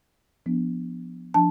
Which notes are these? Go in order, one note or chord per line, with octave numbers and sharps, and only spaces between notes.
F3 B3 D4
F3 D4 A5